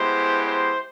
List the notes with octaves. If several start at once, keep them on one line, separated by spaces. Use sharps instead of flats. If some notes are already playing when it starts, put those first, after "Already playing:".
Already playing: G#3 B3 E4 G4 C5
C5